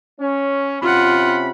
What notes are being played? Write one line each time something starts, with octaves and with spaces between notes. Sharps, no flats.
C#4
C3 C#4 F4 F#5 B5